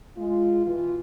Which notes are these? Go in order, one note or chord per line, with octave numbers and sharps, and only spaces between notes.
G#3 F4
B2 E3 F4